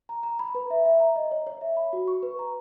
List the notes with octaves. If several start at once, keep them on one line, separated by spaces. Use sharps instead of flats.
A#5
A#5
B5
B4
E5
E5
A#5
D#5
C#5
C#5
E5
B5
F#4
C#6
B4
A#5